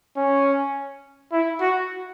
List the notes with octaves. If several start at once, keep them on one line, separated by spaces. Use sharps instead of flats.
C#4
E4
F#4